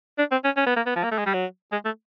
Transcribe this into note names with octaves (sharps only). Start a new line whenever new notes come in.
D4
C4
C#4
C#4
B3
A#3
B3
F3
A#3
A3
G#3
G3
F#3
G#3
A3